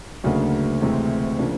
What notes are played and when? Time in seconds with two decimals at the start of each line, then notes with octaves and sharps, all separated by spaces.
0.24 D2 C#3 F#3 A#3 D4
0.81 D2 C3 E3 G#3 C4
1.39 C#3 F3 A#3 D4